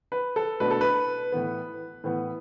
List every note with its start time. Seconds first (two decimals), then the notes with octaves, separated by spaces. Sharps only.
0.12 B4
0.36 A4
0.60 B2 A3 D4 B4
0.71 A4
0.81 B4
1.32 A2 E3 B3
2.04 A2 E3 B3